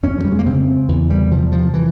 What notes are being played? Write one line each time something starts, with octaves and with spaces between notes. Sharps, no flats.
F2 C#4
F3
G3
G#3
A#3
C#3 C4
E2 E3
G3
C3 F3
F3
E3